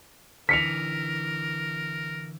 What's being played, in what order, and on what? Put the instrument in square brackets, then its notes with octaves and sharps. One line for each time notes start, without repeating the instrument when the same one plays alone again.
[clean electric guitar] D3 E3 [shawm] A#4 [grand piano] B6 C#7 F7